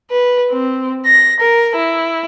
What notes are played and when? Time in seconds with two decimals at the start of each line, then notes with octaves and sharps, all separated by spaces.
0.11 B4
0.50 C4
1.05 A#6
1.40 A#4
1.76 E4